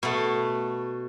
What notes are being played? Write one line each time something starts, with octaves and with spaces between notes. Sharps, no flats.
B2 A3